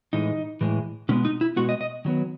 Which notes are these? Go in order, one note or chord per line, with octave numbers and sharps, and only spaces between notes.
A2 E3 G#3 D#4
A2 E3 G#3
B2 G#3 B3 C#4
D#4
E4
B2 G#3 B3 F#4
D#5
D#5
D#3 F#3 B3